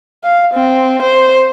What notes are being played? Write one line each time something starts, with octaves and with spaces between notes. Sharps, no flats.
F5
C4
C5